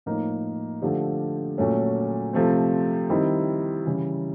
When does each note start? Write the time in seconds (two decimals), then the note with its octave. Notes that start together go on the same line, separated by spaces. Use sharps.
0.06 A2 F3 A#3 D#4
0.82 D3 F3 A3 D4 G4
1.58 A#2 F#3 A3 C#4
2.33 C3 F3 A3 C4
3.09 D#3 G3 C4 E4
3.86 C#3 E3 G3